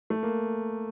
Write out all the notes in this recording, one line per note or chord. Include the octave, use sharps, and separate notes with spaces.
A3
A#3